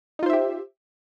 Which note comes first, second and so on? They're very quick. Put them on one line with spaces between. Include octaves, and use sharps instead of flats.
D#4 F4 C5 E5 G4